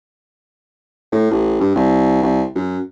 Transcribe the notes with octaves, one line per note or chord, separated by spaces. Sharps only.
A2
A1
G2
C2
C2
F#2